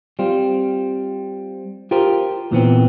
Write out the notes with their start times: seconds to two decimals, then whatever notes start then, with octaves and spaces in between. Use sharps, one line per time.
0.19 G3 C4 F4
1.91 F4 G4 A#4 C5
2.52 A#2 E3 B3 C4